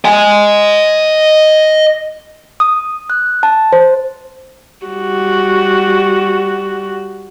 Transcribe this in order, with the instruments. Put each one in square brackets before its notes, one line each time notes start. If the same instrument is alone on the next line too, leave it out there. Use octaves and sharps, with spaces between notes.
[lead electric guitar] D#5 G#5
[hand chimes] D#6
F#6
A5
C5
[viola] G3 F#4